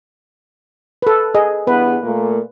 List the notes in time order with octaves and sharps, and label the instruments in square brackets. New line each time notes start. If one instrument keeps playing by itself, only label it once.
[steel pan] A4 B4
G#4 D#5
[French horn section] E2 G2 B3 [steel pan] B4
[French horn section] A#2 A3 A#3